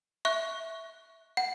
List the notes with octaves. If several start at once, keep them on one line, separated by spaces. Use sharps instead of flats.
E5 C#6 F#6
F#5